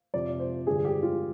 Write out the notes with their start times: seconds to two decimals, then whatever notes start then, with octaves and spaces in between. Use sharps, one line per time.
0.14 F2 C3 F3 D5
0.40 C5
0.67 G2 D3 F3 G#4
0.85 G4
1.03 F4